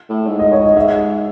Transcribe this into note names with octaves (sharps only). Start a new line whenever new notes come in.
A2
G#2
D#5
C#5
D#5
G#2 E5